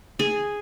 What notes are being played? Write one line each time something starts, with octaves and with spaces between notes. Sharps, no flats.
G#4